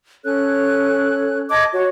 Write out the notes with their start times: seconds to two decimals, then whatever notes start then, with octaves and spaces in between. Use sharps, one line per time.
0.24 C#4 A4 C#5 F#6
1.50 D#5 A5 D6 G#6
1.73 F#4 C#5